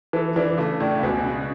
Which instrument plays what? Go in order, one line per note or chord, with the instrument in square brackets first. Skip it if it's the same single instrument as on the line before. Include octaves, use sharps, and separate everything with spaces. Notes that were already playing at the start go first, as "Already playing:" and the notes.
[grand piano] E3 [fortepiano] A4
[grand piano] E3 [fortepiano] D4
[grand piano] C#3 [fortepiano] A3
[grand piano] A2 [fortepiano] D4
[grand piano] C#3
[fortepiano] C#2 [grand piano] B2
[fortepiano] C#3